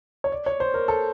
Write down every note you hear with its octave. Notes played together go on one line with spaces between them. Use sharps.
C#5
D5
C#5
C5
A#4
A4